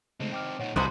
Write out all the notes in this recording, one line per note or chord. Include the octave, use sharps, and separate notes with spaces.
C#3 G#3 A3 C4 D#4
G5 D6 F6
A#2 D#4 C#5 F#5
C2 C3 E3 D#4 F#4 C5 A#5 F#6